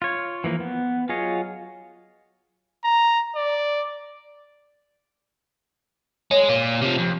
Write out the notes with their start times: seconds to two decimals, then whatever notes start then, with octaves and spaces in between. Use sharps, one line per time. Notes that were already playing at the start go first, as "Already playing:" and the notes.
0.02 F4 C#5
0.44 E3 F3 A#3
0.60 B3
1.09 F#3 F4 G#4 C#5 D#5
2.84 A#5
3.36 D5
6.31 G#3 C#5
6.49 A#2
6.81 C3 F3
6.98 F2